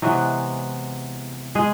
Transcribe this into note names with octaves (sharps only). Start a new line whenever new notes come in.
C3 E3 F#3 G#3 B3 F#4
G#3 G#4